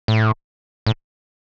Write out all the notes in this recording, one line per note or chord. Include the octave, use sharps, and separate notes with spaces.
A2
A2